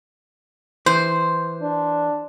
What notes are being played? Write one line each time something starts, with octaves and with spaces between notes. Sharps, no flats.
E3 C5 C6
D4